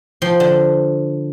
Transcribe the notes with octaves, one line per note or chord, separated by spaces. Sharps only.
F3 G5 C6
D3